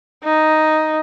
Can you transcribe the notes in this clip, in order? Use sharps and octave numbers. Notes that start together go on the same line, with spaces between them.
D#4